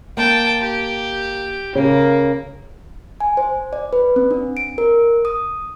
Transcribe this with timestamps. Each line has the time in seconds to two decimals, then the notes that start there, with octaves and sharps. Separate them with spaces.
0.17 A#3 G5 A5
0.61 G4
1.75 C#3 A#3
3.20 G#5
3.37 C5
3.73 D5
3.93 B4
4.16 C4
4.31 D4
4.57 D7
4.78 A#4
5.25 D#6